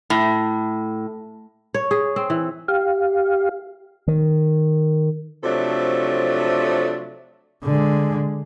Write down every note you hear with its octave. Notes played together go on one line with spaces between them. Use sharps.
A2
C#5
G#4
C4
E3
G4 F5
D#3
C3 F3 F#3 A3 D4 A4
D3 G#3